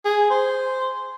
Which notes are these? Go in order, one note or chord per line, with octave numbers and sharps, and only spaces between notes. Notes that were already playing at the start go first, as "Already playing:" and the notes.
G#4
C5